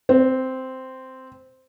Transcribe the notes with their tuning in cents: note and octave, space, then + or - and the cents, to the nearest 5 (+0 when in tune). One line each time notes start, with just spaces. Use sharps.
C4 -5